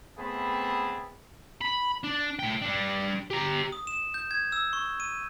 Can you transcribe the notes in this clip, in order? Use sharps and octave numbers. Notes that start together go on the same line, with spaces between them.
A3 B3 C4 G#4 A5 B5
B5
D4
A2 G5
G3 D4
G4 A#5
D#6
E7
G6
G#6
E6
C#6
D#7